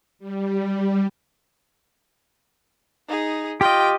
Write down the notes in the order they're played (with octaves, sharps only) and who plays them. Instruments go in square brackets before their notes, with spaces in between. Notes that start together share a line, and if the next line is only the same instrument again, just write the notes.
[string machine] G3
[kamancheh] D#4 G#4
[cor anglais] F4 [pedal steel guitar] G4 D#5 [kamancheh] G5